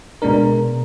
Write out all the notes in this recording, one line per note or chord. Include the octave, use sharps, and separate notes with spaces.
B2 G#3 B3 D4 A#4